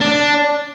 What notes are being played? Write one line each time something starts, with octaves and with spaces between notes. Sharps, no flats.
D4